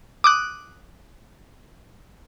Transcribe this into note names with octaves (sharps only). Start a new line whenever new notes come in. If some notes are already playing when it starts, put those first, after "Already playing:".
D6 D#6 F#6